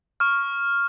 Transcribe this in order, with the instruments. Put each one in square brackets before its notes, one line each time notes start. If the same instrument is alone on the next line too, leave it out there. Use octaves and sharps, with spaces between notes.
[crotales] C#6 F6